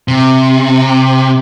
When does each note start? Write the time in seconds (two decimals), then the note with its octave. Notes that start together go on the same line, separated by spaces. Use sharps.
0.08 C3